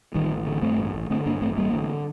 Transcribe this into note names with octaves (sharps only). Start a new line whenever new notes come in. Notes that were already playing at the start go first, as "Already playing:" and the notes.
A1 D#3 G3
A1
D3
G2 A3 C4
A1
A1
D3 A3 C4
G2 A#3 D4
A1 A3 C4
A1 G3 A#3
D3